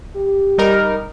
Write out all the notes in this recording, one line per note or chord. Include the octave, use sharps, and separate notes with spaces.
G4
G3 D#4 A#4